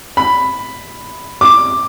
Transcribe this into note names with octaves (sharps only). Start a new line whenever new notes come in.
B5
D6